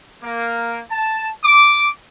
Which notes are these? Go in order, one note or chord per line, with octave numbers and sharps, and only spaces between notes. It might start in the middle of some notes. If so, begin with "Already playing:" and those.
A#3
A5
D6